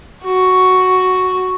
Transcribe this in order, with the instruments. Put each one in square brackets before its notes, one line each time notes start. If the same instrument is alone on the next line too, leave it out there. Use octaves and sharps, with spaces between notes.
[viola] F#4